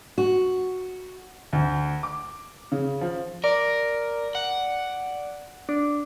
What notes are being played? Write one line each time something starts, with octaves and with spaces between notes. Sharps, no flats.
F#4
D2
D6
C#3
F3
A#4 D5
F#5
D4